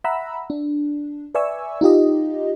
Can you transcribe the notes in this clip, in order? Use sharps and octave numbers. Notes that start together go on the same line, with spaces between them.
E5 F#5 A#5 B5 E6
D4
B4 D5 E5 G#5 C#6 E6
D#4 F4 G4 D#5